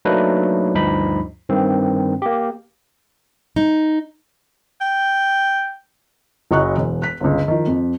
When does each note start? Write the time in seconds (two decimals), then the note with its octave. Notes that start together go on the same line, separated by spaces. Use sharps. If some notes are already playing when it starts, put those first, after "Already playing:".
0.05 F#3 A3 A#3 D4 D#4 B4
0.74 D2 G2 F3 D#4 B5
1.49 G2 D#3 C4
2.22 A#3 G4
3.56 D#4
4.81 G5
6.51 F#1 F#3 D#5 C#6 F#6
6.77 E1
7.02 F#6 B6
7.20 G1 C#2
7.48 D#3 F3
7.67 F2